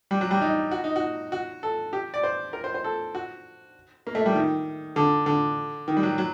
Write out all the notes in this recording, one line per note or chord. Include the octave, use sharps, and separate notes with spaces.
G3
F#3
G3
D#4
F#4
D#4
F#4
F#4
A4
G4
D5
C5
A#4
C5
C5
A4
F#4
A#3
A3
G3
D#3
D3
D3
D#3
G3
F#3
F#3